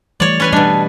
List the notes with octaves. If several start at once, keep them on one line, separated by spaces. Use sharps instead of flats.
E3 G3 A3 C#5 D5
C#4 B4 G#5
B2 G3 D4 D#5 A5